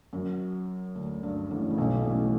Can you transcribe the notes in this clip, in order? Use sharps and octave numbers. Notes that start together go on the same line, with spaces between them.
F#2 F#3
D2 D3
G2
A1 A2
C#3
B1 B2
A1 A2